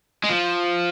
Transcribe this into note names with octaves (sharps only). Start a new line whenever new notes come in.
G#3
F3